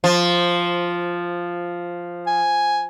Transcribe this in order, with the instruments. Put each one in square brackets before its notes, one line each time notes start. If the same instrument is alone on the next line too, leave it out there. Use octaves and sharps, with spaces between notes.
[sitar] F3
[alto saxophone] G#5